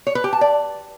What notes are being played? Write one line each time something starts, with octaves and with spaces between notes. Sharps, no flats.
C#5
B4
G4
A5
D5